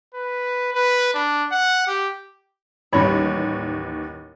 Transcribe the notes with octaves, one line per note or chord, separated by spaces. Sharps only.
B4
B4
D4
F#5
G4
A1 D#2 G3 C#5 B5